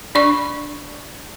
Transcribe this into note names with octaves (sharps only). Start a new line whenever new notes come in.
D4 D5 B5 C#6